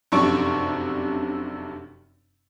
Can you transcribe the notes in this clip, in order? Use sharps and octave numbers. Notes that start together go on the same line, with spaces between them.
F1 F#2 C3 D4 C#6 D7